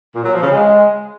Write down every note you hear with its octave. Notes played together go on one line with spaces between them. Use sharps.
A#2
F#3
F3
C#3
G#3